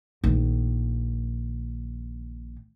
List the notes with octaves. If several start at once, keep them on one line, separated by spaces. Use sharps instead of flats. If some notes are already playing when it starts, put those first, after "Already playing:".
A#1 D#3